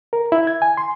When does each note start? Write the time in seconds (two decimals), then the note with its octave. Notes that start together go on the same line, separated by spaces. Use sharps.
0.13 A#4
0.32 E4
0.47 G#6
0.62 G#5
0.77 C6